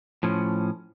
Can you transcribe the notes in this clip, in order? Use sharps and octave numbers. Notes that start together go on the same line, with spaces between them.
A2 F3 C#4